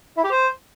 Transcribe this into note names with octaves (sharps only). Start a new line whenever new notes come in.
E4
G4
C5